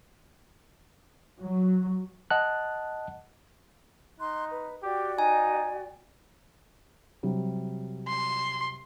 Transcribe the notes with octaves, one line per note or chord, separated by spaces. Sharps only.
F#3
D#5 F#5 A5 F#6
D#4 C6 F#6
B4
F#4 G4 D5 G5
D#4 G#5
C3 F#3 G3
C6